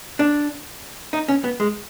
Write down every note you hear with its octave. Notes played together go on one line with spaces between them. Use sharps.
D4
D#4
C#4
B3
G#3